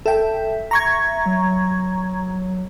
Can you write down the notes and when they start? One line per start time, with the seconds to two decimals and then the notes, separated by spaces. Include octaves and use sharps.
0.06 A4 E5 G5
0.71 A#5 C#6 G#6
1.26 F#3